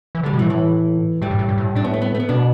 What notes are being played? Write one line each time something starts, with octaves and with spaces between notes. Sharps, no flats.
E3
D3
G3
B2
E3
A2
E3
A2 G3
G2
A2
G2
A2
A2 D4
B3
A3
B3
A3
B3
B2 D4